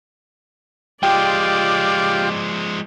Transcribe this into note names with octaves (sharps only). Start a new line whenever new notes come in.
F3 G#3 F4 G4 D5 G5